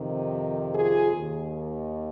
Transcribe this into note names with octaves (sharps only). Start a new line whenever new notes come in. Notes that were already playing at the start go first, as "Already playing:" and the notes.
Already playing: F2 C3 D#3
F4 G#4
D#2 D#3